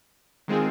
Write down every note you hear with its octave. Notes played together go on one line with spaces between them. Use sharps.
D#3 G#3 C4 F4 G#4